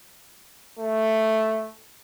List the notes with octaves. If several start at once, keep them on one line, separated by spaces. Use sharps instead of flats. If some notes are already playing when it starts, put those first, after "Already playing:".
A3